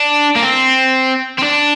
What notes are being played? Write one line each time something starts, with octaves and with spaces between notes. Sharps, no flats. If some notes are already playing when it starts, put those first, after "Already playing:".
Already playing: D4
A#3
C4
C4
D4